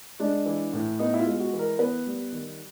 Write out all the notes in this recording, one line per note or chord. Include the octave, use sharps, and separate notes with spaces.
G#3 D4
E3
A2
B3 D#4
E4
F4
G#3
F#4
E3
A#4
B3 B4
G3
D#3